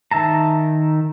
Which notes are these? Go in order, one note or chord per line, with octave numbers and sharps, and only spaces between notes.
D#3 E5 A5 A#5